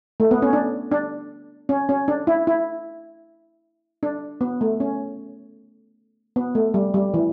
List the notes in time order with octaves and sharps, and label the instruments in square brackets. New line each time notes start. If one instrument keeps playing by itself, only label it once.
[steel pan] A3
B3
C#4
D4
D4
C#4
C#4
D4
E4
E4
D4
B3
A3
C#4
B3
A3
G3
G3
E3